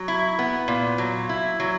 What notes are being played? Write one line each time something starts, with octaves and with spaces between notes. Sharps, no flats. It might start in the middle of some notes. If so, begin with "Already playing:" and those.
Already playing: F#3
E4
B3
A#2
F#3
E4
F#3